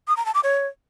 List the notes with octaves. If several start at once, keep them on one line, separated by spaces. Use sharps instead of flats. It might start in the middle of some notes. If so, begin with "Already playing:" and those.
D#6
A#5
A5
D6
C#5